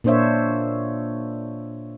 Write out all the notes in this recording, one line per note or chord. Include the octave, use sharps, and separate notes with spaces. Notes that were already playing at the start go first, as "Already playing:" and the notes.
A#2 A#3 D4 C5 C#5 E5